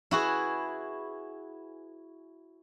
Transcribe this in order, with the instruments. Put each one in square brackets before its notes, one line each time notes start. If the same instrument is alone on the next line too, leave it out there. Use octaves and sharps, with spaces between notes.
[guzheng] E4 F#4 G#4 B4